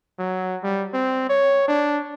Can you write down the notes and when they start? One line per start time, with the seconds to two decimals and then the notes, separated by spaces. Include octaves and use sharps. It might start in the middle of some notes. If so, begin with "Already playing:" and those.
0.19 F#3
0.63 G3
0.93 C4
1.29 C#5
1.68 D4